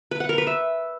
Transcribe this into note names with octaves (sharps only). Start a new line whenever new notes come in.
B4
F#5
A#4
B4
E5